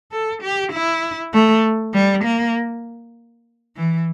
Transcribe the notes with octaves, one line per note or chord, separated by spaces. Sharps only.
A4
G4
E4
A3
G3
A#3
E3